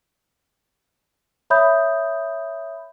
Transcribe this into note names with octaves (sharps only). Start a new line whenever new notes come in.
C#5 E5 B5 D#6 G6